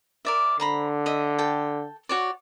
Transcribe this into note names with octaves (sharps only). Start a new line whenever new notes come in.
A#4 D5 E5
D3 C5 A#5 B5
D#5 E5
A4 G5
F#4 C#5 D5